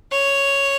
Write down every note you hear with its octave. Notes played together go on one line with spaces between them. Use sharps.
C#5